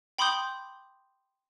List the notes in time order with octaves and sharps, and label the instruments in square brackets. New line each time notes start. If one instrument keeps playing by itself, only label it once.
[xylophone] G5 B5 C6 D6 D#6 G6